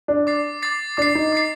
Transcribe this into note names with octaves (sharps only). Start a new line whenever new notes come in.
D4
D6 A6 C7
D6 A6 C7
D4 D6 A6 C7
D#4
D6 A6 C7